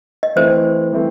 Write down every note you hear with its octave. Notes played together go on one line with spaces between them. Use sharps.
D#5
E3 A3 C4 C5
E3 A3 C4